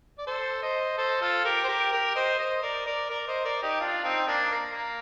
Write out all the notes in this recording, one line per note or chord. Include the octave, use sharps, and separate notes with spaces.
D5
A4 C5
C5 D#5
A4 C5
F4 A4
G4 A#4
C5
G4 A#4
G4 A#4
C5 D#5
C5 D#5
A#4 D5
A#4 D5
A#4 D5
C5 D#5
A#4 D5
D#4 G4
D4 F4
C4 D#4
A#3 D4
A#3
A#3